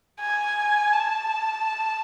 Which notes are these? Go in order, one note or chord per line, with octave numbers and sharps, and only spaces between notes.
G#5
A5